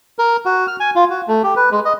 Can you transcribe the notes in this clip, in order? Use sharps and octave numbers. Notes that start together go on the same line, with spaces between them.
A#4
F#4
F6
G#5
F4
F#4
A3
G4
B4
G#3
D#5